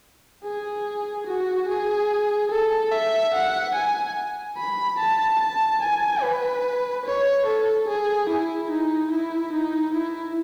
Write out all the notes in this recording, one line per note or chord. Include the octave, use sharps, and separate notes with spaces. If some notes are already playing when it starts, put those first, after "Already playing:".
G#4
F#4
G#4
A4
E5
F#5
G#5
B5
A5
A5
G#5
B4
C#5
A4
G#4
E4
D#4
E4
D#4
E4